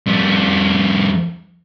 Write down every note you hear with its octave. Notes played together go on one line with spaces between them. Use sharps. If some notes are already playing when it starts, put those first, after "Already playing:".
F2 G3